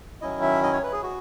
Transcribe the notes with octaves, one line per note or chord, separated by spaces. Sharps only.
D#3 F#3 C#4 E4 D#5
E5
D#5
C#5
B4
G#4
F#4